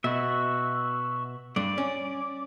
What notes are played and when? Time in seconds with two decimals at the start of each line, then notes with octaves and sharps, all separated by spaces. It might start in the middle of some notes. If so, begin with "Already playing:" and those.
0.04 B2 F#4 E5
1.56 G2 D5
1.78 C#4